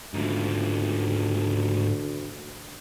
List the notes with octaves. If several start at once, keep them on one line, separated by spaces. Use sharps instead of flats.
D2 G#2 F3